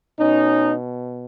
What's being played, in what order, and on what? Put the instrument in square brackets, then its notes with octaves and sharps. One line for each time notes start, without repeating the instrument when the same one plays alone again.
[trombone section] B2 C#4 D#4